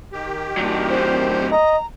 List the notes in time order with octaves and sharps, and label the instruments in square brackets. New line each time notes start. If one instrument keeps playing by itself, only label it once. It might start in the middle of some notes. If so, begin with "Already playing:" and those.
[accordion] D#3 G4
[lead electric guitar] A2 F#3
[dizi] C5
[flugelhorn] D#5 [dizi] A#5